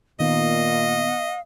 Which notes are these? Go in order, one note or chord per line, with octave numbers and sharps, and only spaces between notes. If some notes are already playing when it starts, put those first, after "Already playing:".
A#2 D#3 B3 D#5 F5